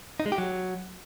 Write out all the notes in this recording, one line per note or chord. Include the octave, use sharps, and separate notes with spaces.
D#4
G#3
G4
F#3